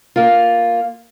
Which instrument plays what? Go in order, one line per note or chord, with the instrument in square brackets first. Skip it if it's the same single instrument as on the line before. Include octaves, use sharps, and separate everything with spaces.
[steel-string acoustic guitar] A#3 F4